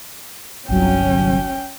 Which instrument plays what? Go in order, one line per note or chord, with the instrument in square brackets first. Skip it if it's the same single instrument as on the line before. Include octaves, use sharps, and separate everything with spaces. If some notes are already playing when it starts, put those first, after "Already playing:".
[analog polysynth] G1 C2 F#3 [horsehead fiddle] C#4 G5